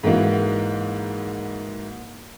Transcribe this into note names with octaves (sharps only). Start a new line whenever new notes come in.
G#2 E3 A#3 F#4